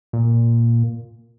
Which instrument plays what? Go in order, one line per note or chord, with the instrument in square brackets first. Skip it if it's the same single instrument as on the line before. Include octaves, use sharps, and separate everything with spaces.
[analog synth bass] A#2